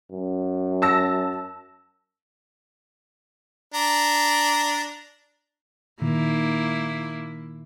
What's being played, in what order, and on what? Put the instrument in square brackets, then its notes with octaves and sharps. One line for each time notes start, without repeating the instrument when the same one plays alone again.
[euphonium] F#2
[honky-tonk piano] A5 E6 A#6
[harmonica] D4 A#5
[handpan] A#2 D#3 [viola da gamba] A#3 E4